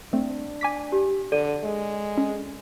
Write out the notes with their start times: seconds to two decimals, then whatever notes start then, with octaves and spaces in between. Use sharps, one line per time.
0.13 A3 C4 D4
0.61 G#5 D6 B6
0.92 G4
1.32 D3 A4 D5 D#7
1.64 G#3
2.18 C#4